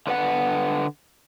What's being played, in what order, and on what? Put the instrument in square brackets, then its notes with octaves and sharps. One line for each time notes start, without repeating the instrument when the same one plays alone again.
[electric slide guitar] D3 B4 F#5